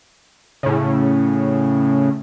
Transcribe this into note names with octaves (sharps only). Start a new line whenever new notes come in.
A2 C#3